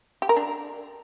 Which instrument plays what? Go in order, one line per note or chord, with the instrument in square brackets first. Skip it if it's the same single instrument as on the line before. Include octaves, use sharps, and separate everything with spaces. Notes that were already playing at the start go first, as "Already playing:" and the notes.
[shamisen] G4
A#4
D4